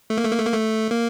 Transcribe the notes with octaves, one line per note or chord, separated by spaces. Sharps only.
A3
A#3
A3
A#3
A3
A#3
A3
A#3